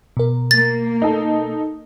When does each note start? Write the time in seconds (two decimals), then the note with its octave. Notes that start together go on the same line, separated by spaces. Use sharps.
0.17 B2 A#4
0.51 A#3 A6
1.02 D#4 A4